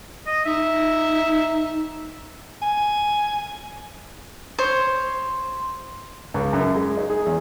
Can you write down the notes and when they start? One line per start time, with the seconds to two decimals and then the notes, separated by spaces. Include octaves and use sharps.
0.26 D#5
0.45 D#4 E5
2.62 G#5
4.59 C5 C#5
6.34 C#2
6.53 F#2
6.76 G#3
6.97 D#4
7.10 G#4
7.26 E2